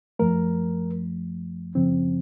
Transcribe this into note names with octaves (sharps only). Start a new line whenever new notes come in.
F#2 F3 A3 A#4
F#2 C#3 F3 C4